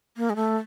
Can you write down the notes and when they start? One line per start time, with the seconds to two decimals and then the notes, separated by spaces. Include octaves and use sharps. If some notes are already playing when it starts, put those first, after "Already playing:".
0.17 A#3
0.30 G#3
0.36 A3